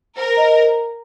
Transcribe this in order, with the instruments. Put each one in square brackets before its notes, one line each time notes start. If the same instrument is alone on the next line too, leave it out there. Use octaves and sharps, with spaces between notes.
[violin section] A#4 [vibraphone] C5
[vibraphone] D#5